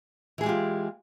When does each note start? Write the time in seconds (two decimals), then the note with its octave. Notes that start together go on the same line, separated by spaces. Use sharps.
0.38 E3
0.41 G#4
0.43 G#3
0.46 G4
0.49 F4